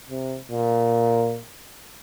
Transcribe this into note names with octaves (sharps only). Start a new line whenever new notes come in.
C3
A#2